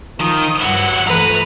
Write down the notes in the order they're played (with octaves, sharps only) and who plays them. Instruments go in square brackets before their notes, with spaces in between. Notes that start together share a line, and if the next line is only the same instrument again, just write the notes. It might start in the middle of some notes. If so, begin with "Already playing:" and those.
[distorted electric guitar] D#3 [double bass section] F3 [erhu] D#6
[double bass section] G2 [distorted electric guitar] F#3 E4 [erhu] F#5
[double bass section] E3 F3 A3 [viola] B4 [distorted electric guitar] A#5